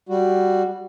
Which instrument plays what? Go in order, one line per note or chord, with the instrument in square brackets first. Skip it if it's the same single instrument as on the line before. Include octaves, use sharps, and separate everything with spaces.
[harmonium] G3 F#4